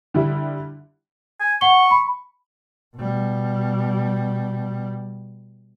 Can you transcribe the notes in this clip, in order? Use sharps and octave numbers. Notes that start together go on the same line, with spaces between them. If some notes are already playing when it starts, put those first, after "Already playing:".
D3 G3 E4
G#5
F#5 C#6 G7
B5
B2 G3